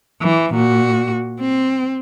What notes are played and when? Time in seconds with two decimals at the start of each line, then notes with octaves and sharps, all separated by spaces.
0.22 E3
0.55 A#2 F#4
1.40 C4